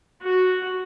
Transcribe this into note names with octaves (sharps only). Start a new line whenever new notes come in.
F#4